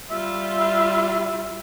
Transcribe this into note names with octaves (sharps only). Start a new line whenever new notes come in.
G3 F4 E5